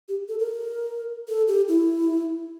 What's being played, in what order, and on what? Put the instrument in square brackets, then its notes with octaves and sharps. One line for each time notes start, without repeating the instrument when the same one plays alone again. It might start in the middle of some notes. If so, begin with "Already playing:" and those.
[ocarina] G4
A4
A#4
A4
G4
E4